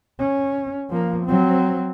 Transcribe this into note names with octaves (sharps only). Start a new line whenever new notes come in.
C#4
F3 A#3
F#3 C4